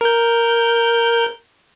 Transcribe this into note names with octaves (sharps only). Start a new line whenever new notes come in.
A#4 G6